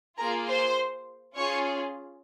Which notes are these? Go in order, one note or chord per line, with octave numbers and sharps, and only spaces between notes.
A#3 F4 G#4 A#4 A#5
C5 C6
C#4 F4 G#4 C#5 C#6